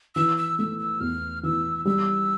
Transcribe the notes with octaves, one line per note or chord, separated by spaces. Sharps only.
E3 E6
E6
A3 E6
E6
E2 F6
E3 E6
G3 E6